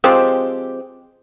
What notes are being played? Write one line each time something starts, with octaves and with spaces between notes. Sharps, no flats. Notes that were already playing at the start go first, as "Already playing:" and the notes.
F3 G#3 C4 G4